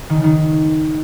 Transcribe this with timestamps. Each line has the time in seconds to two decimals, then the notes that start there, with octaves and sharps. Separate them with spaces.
0.10 D#3
0.17 C#3
0.24 D#3